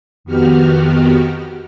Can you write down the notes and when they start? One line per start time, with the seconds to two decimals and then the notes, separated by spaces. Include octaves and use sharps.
0.24 F2 D#3 B3 F#4 G4 F6